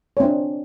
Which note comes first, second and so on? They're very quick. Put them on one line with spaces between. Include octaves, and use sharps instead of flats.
C#5 C4 D4